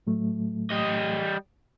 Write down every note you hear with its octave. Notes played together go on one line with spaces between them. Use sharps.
A2 F#3 A3
G3 D#5